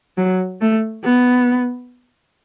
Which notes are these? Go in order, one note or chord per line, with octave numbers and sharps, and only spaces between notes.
F#3
A3
B3